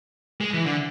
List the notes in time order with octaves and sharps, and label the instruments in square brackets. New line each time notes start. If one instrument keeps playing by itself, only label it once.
[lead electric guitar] G#3
E3
D3